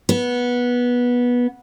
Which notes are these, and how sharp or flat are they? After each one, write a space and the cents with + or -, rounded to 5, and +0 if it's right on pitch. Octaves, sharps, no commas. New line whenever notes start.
B3 -15